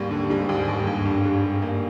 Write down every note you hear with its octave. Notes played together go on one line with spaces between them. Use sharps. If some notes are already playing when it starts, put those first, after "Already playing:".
Already playing: D#2 G#2 G3 A#3
D3
G#2 G3
D#2
G#2
D#2
G2
D#2
G2 D3
G3
G3
A#3